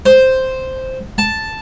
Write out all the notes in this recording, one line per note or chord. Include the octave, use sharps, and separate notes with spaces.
C5
A5